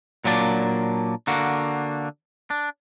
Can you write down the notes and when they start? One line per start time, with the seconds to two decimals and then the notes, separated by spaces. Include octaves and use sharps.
0.25 A#2 F#3 A#3 D4 D5
1.27 D3 A#3 F#4
2.50 D4